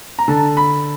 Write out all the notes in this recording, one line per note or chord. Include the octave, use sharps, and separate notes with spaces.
A#5
D3 A5
B5